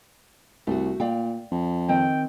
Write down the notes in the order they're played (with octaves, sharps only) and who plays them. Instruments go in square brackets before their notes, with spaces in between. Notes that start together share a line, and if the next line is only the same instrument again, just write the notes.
[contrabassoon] C2 [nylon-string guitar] A3 F#4
[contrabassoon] A#2 [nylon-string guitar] D5 F5 G5
[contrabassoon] F2
[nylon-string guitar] D#3 C4 D#5 [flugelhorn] G5